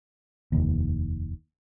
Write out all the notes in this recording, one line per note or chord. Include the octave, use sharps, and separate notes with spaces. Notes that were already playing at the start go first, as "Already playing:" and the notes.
F1 D#2